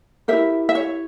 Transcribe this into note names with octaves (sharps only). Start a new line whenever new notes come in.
E4 G4 A#4 C5 E5
E5
C#5